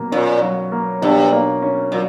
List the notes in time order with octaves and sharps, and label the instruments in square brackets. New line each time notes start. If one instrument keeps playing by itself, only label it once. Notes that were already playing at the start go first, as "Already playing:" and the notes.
Already playing: [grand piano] B2 F#3 A#3
[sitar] A#2 [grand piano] C#4
[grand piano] F#3
A#3
[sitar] G2 [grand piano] B2
[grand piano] A#3
C#4
[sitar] A#2 [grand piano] F#3